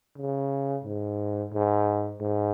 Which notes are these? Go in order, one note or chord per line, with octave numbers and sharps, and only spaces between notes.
C#3
G#2
G#2
G#2